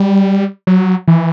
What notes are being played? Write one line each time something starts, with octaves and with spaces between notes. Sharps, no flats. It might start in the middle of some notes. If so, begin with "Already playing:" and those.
Already playing: G3
F#3
E3